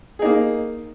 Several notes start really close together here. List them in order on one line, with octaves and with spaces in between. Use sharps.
G#4 D#4 A#3